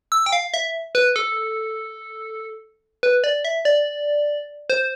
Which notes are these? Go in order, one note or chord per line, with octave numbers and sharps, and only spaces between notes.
E6
G5
F5
E5
B4
A4
B4
D5
E5
D5
C5